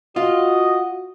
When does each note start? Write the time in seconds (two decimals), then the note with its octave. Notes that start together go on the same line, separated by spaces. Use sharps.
0.16 F4 F#4 D#5